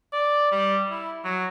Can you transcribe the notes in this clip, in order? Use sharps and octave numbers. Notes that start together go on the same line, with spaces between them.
D5
G3
E4
F#3